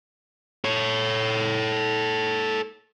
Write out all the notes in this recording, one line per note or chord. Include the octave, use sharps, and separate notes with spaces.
A4 C#5